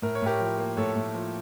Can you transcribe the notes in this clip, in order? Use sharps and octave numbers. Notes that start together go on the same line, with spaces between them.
A2 A#4
C#5
A2 G4 A#4
F3
A#3
A2 A4 C#5
A2
F3